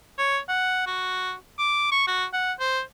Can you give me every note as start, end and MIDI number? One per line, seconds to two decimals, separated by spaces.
0.18 0.38 73
0.49 0.83 78
0.86 1.34 66
1.58 1.89 86
1.92 2.02 85
2.07 2.25 66
2.33 2.53 78
2.60 2.81 72